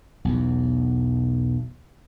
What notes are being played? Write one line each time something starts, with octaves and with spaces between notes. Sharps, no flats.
B1 E2